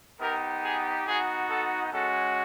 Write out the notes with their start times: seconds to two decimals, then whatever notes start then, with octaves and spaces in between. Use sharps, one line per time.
0.21 B3 D#4 G4 A#4
0.63 G#4
1.07 B3 D#4 F#4 G#4
1.50 A4
1.92 G#3 C#4 F#4 A4